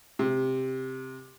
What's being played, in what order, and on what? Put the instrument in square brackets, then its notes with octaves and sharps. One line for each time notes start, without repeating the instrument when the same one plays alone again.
[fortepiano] C3